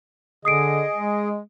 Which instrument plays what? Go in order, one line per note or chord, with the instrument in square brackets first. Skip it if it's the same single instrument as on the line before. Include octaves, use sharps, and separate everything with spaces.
[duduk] D3 [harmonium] G#4 D#5 [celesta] D#6 C7 D7
[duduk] G#3